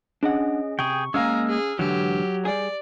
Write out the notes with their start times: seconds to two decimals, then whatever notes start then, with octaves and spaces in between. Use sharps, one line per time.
0.23 C#4 D4 G#4 D#5 F#5
0.79 C3 G#4 G5 C#6
1.14 G#3 A#3 C#4 F5 G#5 A#5 E6 F6
1.47 G#4
1.79 G#2 D3 E3 F#3 G4
2.45 G3 G#4 D5